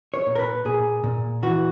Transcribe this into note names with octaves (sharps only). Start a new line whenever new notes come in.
C#5
A#2
A#4
B4
A#2 G#4
A#2
E3 F#4